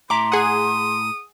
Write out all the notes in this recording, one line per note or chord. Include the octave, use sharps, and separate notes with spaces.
A2 E5 A#5 C6 D6
G#4 F#5 D#6